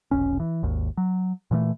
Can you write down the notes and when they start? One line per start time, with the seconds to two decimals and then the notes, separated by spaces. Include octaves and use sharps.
0.11 F1 B1 C#4
0.40 E3
0.63 G#1 D#2
0.97 F#3
1.51 A#2 E3 G#3 A3